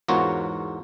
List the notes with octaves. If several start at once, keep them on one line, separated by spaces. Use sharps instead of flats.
E2 G#2 F4 F#4 A#4 C#5